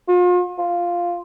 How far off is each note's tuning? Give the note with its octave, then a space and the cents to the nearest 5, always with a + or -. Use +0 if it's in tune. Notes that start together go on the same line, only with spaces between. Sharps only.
F4 +40
F4 +0